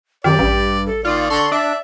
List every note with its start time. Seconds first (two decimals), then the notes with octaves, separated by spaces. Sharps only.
0.24 F#2 D#3 G4 D5
0.39 A1 G2
0.86 A4
1.04 D#3 A#3 F4 D5
1.30 D3 A4 C6 C#6
1.52 D4 E5